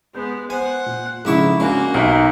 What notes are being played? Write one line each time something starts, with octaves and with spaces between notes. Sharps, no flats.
G#3 B3 G6
C5 F#5 G#5
A#2
F2 G#2 C#3 D4 E4 C#6
C#3 G#3 A#3 D4 F#4
B1 C3 D#4 D7